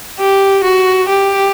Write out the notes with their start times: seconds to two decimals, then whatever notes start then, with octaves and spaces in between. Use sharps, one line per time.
0.19 G4
0.64 F#4
1.09 G4